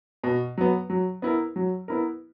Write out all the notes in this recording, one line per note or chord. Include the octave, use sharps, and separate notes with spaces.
B2
F#3 B3
F#3
B3 E4 A#4
F#3
B3 E4 A#4